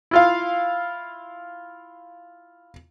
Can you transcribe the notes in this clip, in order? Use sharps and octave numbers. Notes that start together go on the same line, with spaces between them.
E4 F4 F5